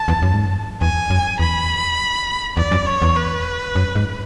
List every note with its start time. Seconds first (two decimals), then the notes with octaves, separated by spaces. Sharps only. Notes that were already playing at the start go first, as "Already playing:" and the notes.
Already playing: A5
0.08 E2
0.22 F#2
0.34 G#2
0.46 F#2
0.81 E2 G#5
1.10 F#2
1.40 E2 B5
2.57 E2 D5
2.72 F#2
2.87 C#5
3.02 E2
3.16 B4
3.75 F#2
3.95 G#2